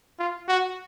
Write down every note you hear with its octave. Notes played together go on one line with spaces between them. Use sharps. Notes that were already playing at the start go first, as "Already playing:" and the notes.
F4
F#4